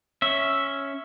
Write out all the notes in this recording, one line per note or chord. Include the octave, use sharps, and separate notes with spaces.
C#4 E5